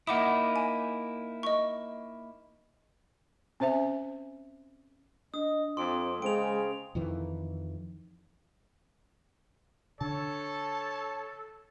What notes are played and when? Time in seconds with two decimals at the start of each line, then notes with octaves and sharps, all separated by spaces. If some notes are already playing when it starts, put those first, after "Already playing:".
0.07 A#3 D#4 E4 F#5 D6 D#6
0.56 G#5
1.43 D#5 C#6
3.60 C4 C#4 C5 E5 G#5
5.34 D4 D#5 D#6
5.77 F2 C4 C6 D6 D7
6.22 C#3 G#3 C5 G5 D7 F7
6.95 F2 D#3 E3
10.01 D3 A4 C#5 A5